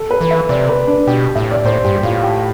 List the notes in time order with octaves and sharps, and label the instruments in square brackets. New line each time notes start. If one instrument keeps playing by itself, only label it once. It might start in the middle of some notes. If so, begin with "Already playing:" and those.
Already playing: [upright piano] A4
B4
[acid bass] E3
[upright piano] E5
[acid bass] C3 [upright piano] D5
[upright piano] B4
D4
[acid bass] B2 [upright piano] G4
[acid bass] A2 [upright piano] E5
[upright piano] D5
[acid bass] A2 [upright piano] C5
[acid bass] G2 [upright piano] G4
[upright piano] G4
[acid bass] A2 [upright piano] F4
[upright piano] G4